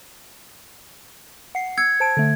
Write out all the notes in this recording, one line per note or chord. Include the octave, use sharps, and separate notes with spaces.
F#5 C7
E6 G#6 C#7
C5 A5 D7
D3 A3